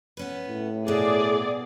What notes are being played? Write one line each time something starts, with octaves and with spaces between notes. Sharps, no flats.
B3 C#4 B4
A2
G2 B2 G#4 D5